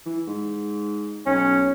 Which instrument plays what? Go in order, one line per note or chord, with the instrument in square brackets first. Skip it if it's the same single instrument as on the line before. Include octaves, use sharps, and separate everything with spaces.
[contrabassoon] E3
G#2
[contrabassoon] B1 [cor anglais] C#4